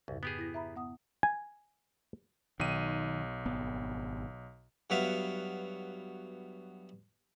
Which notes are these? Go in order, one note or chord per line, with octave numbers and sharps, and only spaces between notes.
C2 F2 G#2 C#3
B3 G4 G#4 D#6
E4 A#6
E5 A#5 B5
B3 F#5 D#6
G#5
B1 D#3 D#7
G#1 B3
G2 F#3 B3 E5 F5